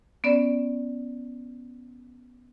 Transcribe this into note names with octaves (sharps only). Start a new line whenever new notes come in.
B3 C#4 D5